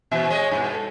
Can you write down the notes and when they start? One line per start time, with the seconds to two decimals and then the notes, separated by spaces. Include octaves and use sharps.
0.11 A#2 E3 E5
0.30 G#3 G#4 C#5 D#5
0.51 G2 B2
0.73 A4